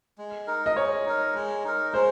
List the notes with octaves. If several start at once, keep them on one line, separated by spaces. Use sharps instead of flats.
G#3
D#4 A#4
D#5
G#3 C#5
D#4 A#4
G#3
D#4 A#4
G#3 C5